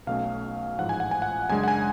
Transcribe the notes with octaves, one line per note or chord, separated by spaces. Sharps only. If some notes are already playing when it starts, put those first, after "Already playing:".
B1 B2 A3 C#4 F5
A1 G#2 F3 F#5
G#5
F#5
G#5
F#5
F#2 C#3 G#3 D4 G#5
F#5
G#5